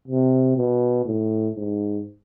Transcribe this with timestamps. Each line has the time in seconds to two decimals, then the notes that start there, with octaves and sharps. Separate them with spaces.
0.08 C3
0.57 B2
1.05 A2
1.55 G#2